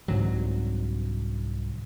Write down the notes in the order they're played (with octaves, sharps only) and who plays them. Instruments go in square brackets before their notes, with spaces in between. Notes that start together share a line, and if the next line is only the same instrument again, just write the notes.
[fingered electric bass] C2 G#2 D3 F#3